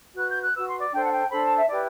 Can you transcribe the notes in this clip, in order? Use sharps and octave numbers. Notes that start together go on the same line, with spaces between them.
F#4 B4 F#6
G6
F#6
F#4 B4 E6
C6
D5
D4 A4 C5 G5
F#5
G5
D4 A4 C5 B5
A5
E5
E4 G4 B4 D5